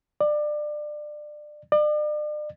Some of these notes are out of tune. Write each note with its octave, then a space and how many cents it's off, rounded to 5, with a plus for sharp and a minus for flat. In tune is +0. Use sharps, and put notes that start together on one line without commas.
D5 +25
D5 +40